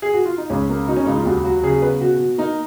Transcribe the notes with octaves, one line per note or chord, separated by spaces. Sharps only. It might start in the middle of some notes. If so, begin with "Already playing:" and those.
G#4
F#4
F4
D#4
C#2 C#4
A#3
B2 D#4
C#4
C#2 D#4
F4
D#2 F#4
F#3 F#4
C#3 G#4
B3 B4
B2 F#4
B2
A#3 D#4